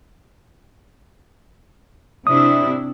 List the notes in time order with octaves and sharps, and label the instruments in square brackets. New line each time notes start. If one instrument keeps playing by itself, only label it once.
[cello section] C3 D4 E4 [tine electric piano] D#6